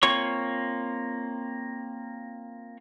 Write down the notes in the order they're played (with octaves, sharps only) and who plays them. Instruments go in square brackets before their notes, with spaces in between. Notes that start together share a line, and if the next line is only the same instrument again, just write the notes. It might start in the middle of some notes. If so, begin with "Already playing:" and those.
[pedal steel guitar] A#3 C4 F4 C#5 C#6